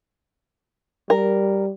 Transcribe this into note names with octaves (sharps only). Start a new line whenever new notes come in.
G3 A#4